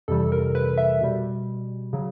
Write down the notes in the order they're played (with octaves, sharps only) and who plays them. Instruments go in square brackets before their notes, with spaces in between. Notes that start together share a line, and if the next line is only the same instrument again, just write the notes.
[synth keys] F2 C3 E3 G3 A4
A#4
B4
E5
B2 G3
C#3 F#3